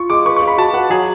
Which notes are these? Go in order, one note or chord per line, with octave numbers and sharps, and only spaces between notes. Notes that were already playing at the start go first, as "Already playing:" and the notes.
Already playing: F4 C#6
G#3 D6
B4 C#6
C#6
F5
B5
F#4 A5
B4 F#5
F#3 G#4